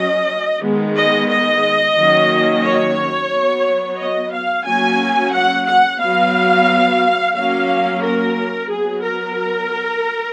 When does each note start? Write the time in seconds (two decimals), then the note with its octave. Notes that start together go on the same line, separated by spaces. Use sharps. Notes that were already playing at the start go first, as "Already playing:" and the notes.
Already playing: F#3 C#4 D#5
0.62 D#3 G#3 B3
0.95 D#5
1.29 D#5
1.97 D#3 F#3 A#3 C#4
2.63 C#5
3.31 F#3 B3
3.98 D#5
4.33 F5
4.66 F#3 A#3 C#4 G#5
5.33 F#5
5.67 F#5
6.00 F#3 B3 F5
7.35 F#3 A#3 C#4 F5
8.03 A#4
8.70 F#3 B3 G#4
9.03 A#4